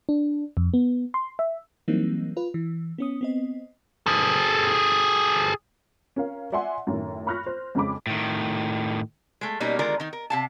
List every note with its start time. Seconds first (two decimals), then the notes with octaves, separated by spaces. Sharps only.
0.09 D4
0.57 F2
0.74 B3
1.14 C6
1.39 E5
1.88 E3 F#3 G3 A#3 C4 D#4
2.37 F4 B4
2.54 E3
2.98 B3 C#4 D#6
3.21 B3 C4 D#5
4.06 G#4 A4
6.16 C#4 A#4 F5
6.52 D5 E5 F#5 G#5 C6
6.87 F#2 A2 D#3
7.27 B5 C#6 F6 F#6 A#6
7.46 C5
7.75 F2 C#3 G#3 B5 D6
8.07 A2 D#3
9.41 G#3 A3
9.60 B2 G3 A#3 C#4 D#4
9.79 D3 D#3 G#3 F4 A#4 D5
10.00 D#3 D#4
10.13 A#4
10.30 C3 F5 A5